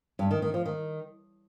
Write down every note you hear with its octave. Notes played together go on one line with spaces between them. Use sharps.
G2
D#3
D#3
F3
D#3